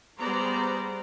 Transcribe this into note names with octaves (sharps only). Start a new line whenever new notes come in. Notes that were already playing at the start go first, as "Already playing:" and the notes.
G3 B3 G#4 C5 D5 A#5